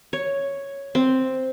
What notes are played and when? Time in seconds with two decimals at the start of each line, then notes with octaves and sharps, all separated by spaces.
0.13 C#5
0.95 C4